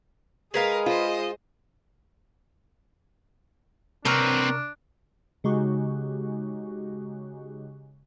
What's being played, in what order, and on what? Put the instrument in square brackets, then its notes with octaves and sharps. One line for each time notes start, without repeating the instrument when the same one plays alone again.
[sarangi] G#3 [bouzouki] G#4 B4 F5 [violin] A#4
[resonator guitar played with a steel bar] F4 [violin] C5 D#5
[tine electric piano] C3 F6 [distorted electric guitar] C4 B4 [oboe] D4 [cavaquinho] A#4 C#5 A#5
[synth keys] C#3 G#3 D#4 F#4 G4